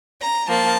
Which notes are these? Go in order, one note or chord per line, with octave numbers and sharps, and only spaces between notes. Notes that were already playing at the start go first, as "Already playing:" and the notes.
A#5
F3 A#3 A5